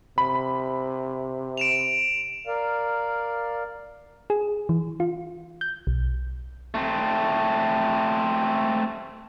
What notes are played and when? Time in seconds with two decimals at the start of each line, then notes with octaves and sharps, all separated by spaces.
0.18 C3 B5
1.57 D7 E7 F7
2.47 A#4 D5 F5
4.30 G#4
4.69 E3
5.00 F4
5.61 G6
5.87 B1
6.74 A3 C4